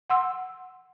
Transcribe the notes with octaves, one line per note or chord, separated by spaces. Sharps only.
F#5 C6 E6